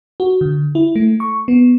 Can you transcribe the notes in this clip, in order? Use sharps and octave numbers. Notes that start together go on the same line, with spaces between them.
F#4
D3
E4
A3
C#6
B3